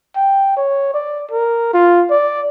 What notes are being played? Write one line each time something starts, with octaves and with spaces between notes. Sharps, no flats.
G5
C#5
D5
A#4
F4
D5